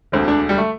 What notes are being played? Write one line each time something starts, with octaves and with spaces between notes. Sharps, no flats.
E1 D2 D3 C4
D4
G3
A3